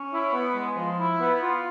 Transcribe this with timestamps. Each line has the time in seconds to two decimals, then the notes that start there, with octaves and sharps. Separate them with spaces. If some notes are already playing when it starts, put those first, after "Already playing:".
Already playing: C#4
0.13 E4
0.33 B3
0.55 G#3
0.77 F3
0.99 E4
1.20 B3
1.42 F4